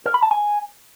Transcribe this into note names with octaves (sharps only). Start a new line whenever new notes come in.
A#4
B5
A5
G#5